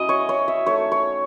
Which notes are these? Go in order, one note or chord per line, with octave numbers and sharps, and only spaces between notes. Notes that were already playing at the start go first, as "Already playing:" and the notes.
Already playing: F#3 C#4 E4 D#5
C#5
C#5
E5
A3 D#4 C#5
C#5